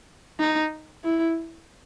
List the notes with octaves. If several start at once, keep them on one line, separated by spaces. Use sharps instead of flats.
D#4
E4